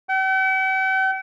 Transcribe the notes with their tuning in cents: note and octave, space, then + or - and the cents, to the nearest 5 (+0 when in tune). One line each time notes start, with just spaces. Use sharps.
G5 -45